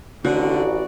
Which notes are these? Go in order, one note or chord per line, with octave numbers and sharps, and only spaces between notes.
A1 D3 D#3 C4 F#4 D5